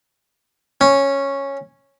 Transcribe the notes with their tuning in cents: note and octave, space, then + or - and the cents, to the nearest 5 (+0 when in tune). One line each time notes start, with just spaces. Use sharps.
C#4 -5